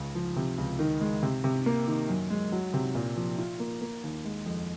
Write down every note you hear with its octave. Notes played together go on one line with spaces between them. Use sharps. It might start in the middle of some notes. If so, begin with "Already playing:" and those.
Already playing: C#2
F3
C3
C#2
D#3
G#3
C3
C3
A#3
D#3
F#2
G#3
F#3
C3
A#2
F3
F4
A#3
A#3
D#2
G#3
F2